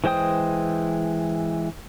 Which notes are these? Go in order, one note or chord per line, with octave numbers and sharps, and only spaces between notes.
E3 G#3 C5 G5 D#6